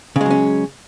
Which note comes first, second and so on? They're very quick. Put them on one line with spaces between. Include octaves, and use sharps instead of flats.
C#3 G#3 F#3 C#4